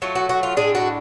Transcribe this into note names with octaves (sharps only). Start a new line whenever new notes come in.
F#3 A3 F4
F#4
F#4
F4
A2 G#3 D4 G#4
F#4